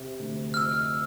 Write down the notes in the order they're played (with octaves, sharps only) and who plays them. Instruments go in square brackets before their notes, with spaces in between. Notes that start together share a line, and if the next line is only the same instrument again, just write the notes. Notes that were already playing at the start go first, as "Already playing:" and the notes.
Already playing: [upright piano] C3
D2
[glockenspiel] F6
[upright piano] F2 [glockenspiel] E6